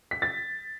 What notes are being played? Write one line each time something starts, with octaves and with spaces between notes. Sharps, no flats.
B6
A6